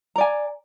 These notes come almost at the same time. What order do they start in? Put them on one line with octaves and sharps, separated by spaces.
A#5 D5 G#5